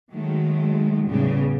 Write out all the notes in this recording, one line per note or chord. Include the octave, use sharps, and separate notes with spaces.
D#3 F#3 G#3 A3
E2 A2 C#3 G3 B3